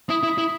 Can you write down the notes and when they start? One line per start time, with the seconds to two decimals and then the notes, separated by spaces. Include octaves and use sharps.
0.09 E4 D#6
0.23 E4
0.29 D#6
0.38 E4